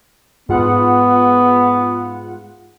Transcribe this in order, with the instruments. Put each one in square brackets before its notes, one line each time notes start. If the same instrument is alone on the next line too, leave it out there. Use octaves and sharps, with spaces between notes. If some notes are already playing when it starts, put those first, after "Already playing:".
[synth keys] G#2 F4 F#5 [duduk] B3